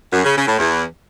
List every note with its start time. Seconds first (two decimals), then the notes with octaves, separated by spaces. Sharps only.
0.12 F#2
0.24 C#3
0.36 C#3
0.47 A2
0.59 E2